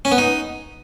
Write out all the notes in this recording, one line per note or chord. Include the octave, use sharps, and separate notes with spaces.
C#4
B3
D#4